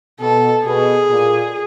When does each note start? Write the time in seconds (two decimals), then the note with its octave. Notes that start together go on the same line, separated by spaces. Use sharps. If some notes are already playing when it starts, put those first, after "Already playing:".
0.20 B2 A4
0.65 B2 G#4
1.10 A#2